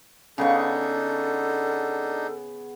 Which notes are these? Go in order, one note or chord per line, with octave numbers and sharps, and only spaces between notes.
C#3 B3 D4 D#4 A4 C#6